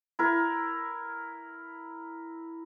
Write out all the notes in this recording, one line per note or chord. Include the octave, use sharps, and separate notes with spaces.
E4 A#4